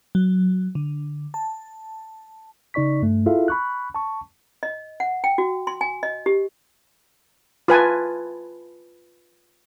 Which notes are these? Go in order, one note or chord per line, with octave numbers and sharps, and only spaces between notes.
F#3
D3
A5
C#3 D#4 D5 C#6 B6
G2 A3
E4 F4 G#4 A4 E5 F5
B5 C#6 F#6
A5 C#6
D#5
F#5
G5
F#4
C6
G#5
D#5
G4
F4 B4 G#5 A5